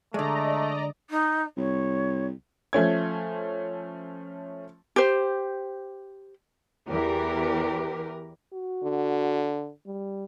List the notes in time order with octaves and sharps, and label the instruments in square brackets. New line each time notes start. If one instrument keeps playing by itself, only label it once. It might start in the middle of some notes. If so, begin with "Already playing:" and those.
[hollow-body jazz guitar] D3 G#3 [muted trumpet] A3 [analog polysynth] D5 D#5 A#5
[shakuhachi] D#4
[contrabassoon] C2 [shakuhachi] C#5
[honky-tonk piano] F3 A3 C#4 G#6
[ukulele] G4 C5
[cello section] E2 E3 G4 A#4 B4
[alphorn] F#4
[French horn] D3
[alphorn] G3